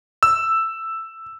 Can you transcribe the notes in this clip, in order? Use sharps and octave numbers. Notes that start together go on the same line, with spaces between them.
E6